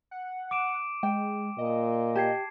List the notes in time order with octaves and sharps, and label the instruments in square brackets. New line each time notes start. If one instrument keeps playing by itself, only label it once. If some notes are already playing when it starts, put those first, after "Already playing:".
[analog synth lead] F#5
[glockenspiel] D6 D7 E7
[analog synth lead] G#3 [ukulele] G5
[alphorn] A#2 [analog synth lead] D#5
[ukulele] G4 [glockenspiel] A5 G#6 C7